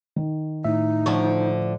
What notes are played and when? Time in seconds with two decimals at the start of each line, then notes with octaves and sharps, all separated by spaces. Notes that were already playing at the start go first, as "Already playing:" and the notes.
0.16 D#3
0.65 A2 D#4 E5
1.06 D3 F3 C#5